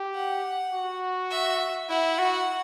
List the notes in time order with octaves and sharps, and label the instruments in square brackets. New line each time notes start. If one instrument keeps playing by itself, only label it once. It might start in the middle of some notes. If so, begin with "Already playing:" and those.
Already playing: [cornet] G4
[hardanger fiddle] F#5
[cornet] F#4
[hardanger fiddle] E5
[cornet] E4 [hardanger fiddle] F#5
[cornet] F#4